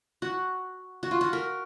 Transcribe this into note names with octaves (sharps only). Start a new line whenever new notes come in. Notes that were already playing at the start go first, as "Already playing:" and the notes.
F#4
F#4
F4
F#4
A#4